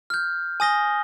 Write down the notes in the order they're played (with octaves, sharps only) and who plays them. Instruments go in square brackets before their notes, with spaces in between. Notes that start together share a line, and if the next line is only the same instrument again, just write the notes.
[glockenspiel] F6 G6
G#5 D#6 A#6 G7